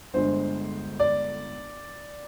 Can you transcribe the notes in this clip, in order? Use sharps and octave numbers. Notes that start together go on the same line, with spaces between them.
G1 G2 D3 G#3 C5
D5